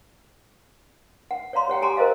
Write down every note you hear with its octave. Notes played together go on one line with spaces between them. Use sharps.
F#5
C#5 D5 F5 A#5 C6
G4 C#5 F#5 G5
G4 A4 G#5 A#5 C6 D6
A#4 C5 D#5 F5